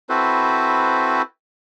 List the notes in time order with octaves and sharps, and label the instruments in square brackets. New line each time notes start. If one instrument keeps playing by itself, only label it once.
[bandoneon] C4 E4 F#4 A4 B4 C5